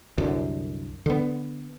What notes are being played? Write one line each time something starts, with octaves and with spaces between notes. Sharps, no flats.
C2 F#2 D3
D3 B3